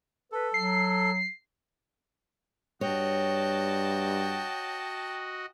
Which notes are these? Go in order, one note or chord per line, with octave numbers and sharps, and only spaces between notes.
A4 B4
F#3 C7
G2 F#4 C#5 D#5 G5 A5